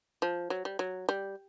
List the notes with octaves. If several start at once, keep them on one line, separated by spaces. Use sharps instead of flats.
F3
F#3
G3
F#3
G3